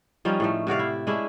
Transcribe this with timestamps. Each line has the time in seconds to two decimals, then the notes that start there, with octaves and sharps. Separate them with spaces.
0.25 F3 G3 C#4 D#4
0.40 A2 F3 A3
0.67 C3 F#4 D5 F5
0.79 E4
1.07 G#3 C#4 D4 E4